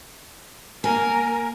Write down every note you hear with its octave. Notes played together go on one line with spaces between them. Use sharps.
A#3 A#4 G#5